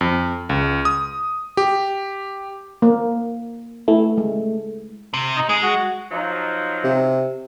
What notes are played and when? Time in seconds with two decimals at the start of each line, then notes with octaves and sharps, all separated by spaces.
0.01 F2
0.49 C#2
0.85 D#6
1.57 G4
2.82 A#3
3.88 A3 E4
4.18 G#3
5.14 C3
5.37 D#4
5.49 G#3 G#4
5.63 F#4
6.11 F3 F#3 D#4
6.84 C3